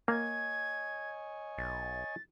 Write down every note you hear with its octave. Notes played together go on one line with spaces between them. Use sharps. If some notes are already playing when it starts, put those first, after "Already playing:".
A#3 C#5 D#5 G#5 G#6
B1 A6